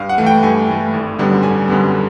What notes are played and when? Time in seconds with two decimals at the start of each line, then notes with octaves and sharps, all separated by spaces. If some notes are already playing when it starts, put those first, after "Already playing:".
Already playing: G2 F5
0.09 F#5
0.18 E3 A3
0.27 G5
0.43 G2 G#5
0.68 E3 A3
0.93 G#1
1.19 F#2 D3 G3 B3
1.43 G#1 G#5
1.68 F#2 D3 G3 B3